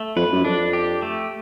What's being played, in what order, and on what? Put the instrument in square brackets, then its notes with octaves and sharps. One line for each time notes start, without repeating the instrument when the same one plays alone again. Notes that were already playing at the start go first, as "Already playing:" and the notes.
Already playing: [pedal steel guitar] A3
[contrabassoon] F2 [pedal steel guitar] B4
[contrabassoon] F#2
[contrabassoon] F2 [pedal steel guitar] D4
[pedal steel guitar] G4
A3